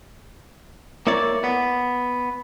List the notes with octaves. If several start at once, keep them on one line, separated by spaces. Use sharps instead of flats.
A#3 E4 C#5 D5
B3